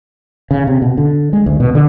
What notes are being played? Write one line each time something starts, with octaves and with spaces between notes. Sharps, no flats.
C#3
C3
B2
D3
G#3
D2
B2
D3